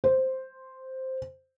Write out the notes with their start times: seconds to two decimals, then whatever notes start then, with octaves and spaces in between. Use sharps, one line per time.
0.04 C5